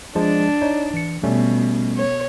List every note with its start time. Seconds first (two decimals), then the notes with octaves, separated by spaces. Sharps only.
0.15 F3 G#3 D4 A5
0.61 D#4 C#5 D5
0.94 E3 C#7
1.24 B2 G3 A3 C#4
1.97 C#5